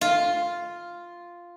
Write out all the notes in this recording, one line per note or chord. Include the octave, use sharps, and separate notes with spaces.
F4